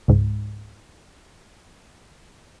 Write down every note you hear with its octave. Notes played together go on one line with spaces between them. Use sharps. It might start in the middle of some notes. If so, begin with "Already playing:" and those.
C#2 G#2